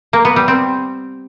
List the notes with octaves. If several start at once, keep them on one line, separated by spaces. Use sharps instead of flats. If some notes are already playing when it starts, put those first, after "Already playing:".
A#3
B3
G3
C4